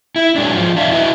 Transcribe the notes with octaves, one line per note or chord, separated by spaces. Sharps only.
E4
F#3 G#3 D4
G#2 F3 F4
E2 D4 E5 F5
E4 F#4 B4 D#5 E5